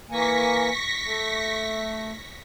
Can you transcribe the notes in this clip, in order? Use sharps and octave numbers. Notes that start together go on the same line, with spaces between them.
E3 A#3 G#5 C#6 A#6 B6
A3